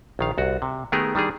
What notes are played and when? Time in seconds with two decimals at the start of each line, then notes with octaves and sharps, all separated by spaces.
0.19 A#1 D#3 F5
0.38 C2 F#4
0.62 C3
0.92 D#3 A3 B3 G4 G#4 A#4
1.15 D#3 G3 D4 G#4